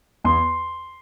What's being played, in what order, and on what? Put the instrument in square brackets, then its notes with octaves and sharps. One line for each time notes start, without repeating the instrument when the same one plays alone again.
[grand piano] E2 C6